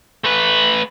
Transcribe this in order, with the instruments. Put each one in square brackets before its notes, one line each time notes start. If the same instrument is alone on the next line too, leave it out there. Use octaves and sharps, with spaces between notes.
[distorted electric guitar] A3 B4